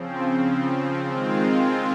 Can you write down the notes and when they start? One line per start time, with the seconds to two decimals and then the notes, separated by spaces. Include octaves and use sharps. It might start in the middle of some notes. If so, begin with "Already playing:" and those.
Already playing: C#3 F3 C4
1.08 D#3 G#3 C4 F4